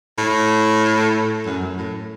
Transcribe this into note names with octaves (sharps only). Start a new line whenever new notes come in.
A2
F#2
F#2
A2